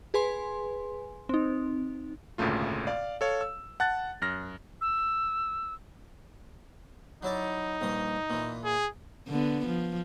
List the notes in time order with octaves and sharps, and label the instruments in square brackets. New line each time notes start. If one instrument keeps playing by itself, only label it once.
[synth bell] G#4 B4 G#5 C6
C4 D#4
[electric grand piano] G#1 D2 A#2 C#3 A3 F4
D5 F5
A4 C#5 F5
E6
F#5 A5 F#6 A6
F#2 F6 A#6
[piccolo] E6
[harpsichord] F#3 E4 D5 [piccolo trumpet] D#4
[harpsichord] A#1 G2 D#5
A#2 E3
[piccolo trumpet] G#4
[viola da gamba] D3 B3
F3